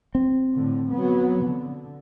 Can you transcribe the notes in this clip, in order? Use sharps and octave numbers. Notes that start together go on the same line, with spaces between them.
C4
A2 D3
F#3 B3
D3